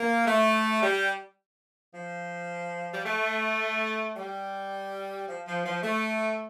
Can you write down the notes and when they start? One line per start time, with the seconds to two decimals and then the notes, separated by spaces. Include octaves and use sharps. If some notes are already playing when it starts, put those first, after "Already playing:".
Already playing: A#3
0.27 A3
0.83 G3
1.94 F3
2.94 G3
3.06 A3
4.17 G3
5.28 F3
5.47 F3
5.65 F3
5.83 A3